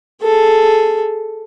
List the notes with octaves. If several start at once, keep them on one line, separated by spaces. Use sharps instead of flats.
G#4 A4